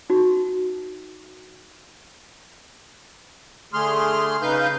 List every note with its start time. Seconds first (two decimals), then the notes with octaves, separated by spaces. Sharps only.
0.10 D#4 F#4
3.73 D3 A3 G#4 C6 F6
4.42 C#3 D#4 B4 F5 G6